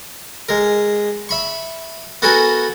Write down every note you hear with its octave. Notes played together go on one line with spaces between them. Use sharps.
G#3 A#4
E5 B5 C#6
B3 F#4 A4 A#4 G#5 B5